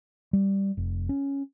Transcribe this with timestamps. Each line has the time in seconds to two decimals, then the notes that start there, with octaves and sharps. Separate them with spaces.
0.33 G3
0.77 F1
1.09 C#4